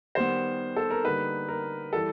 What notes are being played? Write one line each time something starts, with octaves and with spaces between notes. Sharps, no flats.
D#3 G3 B3 C5
A4
A#4
D3 G3 A#3 D#4 B4
A#4
E3 G3 A4